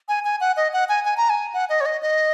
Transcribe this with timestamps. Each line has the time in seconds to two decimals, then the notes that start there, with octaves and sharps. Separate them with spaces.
0.09 G#5
0.25 G#5
0.41 F#5
0.57 D#5
0.73 F#5
0.89 G#5
1.05 G#5
1.17 A#5
1.30 G#5
1.54 F#5
1.69 D#5
1.81 C#5
1.86 D#5
2.02 D#5